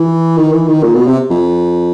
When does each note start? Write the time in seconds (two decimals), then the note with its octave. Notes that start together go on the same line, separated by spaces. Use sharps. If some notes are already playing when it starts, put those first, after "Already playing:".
Already playing: E3
0.37 D#3
0.52 E3
0.68 D#3
0.83 A#2
0.95 B2
1.07 C3
1.30 F2